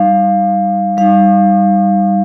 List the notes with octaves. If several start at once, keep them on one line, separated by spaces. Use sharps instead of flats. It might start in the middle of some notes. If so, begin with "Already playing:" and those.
Already playing: G3 D#4 F5
G3 D#4 F5